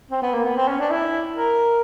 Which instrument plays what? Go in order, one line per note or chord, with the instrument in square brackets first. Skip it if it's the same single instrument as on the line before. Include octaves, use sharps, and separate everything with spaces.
[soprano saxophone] C4
B3
A#3
B3
C4
C#4
D4
E4
A#4